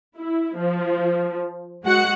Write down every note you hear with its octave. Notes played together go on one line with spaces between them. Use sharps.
E4
F3
G#3 F#4 F#5 C#7